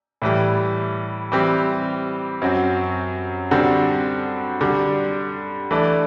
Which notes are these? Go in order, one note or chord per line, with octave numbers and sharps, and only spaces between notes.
A2 E3 G3
E3 G3 C4 G4
F#2 F#3 C4 F#4
D3 G3 C4 F#4
D3 G3 D4
E3 A3 D4